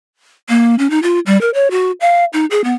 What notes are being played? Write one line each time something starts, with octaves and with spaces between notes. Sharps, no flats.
A#3
C#4
D#4
F4
G3
A#4
C#5
F#4
F5
D#4
G#4
B3